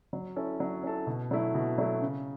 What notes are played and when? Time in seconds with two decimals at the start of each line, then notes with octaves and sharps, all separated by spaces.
0.13 F#3
0.36 C#4 E4 A4
0.60 F#3
0.83 C#4 E4 A4
1.07 B2
1.31 F#3 A3 E4
1.54 B2
1.78 F#3 A3 E4
2.02 C#3